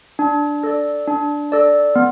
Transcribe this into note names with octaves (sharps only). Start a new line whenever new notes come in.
D4
A4 D5
D4
A4 D5
B3